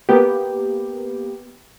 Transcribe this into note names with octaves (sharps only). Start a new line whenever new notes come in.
A#3 B3 G4